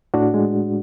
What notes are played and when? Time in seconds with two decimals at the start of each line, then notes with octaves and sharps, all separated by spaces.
0.14 A2 D4 F#4
0.34 G#3